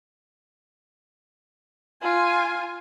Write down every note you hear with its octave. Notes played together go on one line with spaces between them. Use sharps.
F4 G#5